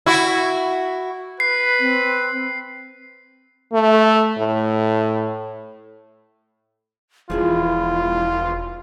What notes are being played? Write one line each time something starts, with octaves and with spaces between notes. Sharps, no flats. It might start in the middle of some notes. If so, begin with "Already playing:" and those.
E4 F#4
B4 C7
C4
A3
A2
E1 F3 E4 F4 G#4 E5